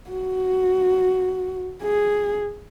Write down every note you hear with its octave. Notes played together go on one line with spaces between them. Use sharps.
F#4
G#4